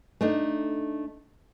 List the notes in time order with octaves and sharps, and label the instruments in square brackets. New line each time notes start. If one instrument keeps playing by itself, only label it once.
[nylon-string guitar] A3 D4 D#4